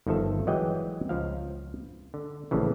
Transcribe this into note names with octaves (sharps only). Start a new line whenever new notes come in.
G1 D#3 F3 A4 E5
E3 F#3 G#3 D5 D#5 G5
C#2 F3 F5
D3
A#1 A2 C#3 E3